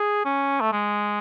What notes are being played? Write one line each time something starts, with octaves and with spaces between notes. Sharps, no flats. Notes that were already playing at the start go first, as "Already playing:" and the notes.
Already playing: G#4
C#4
A3
G#3